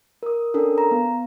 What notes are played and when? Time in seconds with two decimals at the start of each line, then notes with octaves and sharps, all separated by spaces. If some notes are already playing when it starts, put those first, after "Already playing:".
0.23 A#4 D#6
0.54 C#4 D4 A4 A#4
0.78 A#5
0.91 B3